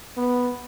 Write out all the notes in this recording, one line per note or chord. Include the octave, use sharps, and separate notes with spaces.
B3